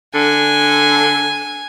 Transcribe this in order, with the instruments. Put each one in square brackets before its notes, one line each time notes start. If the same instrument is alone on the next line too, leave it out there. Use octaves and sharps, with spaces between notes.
[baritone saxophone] D3 [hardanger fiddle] G#5